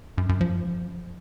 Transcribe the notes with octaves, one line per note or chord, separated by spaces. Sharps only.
F#2
F#2
F3